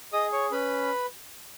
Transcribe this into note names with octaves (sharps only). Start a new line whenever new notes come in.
G#4 D#5 D#6
C#5 C#6
C#4 B4 B5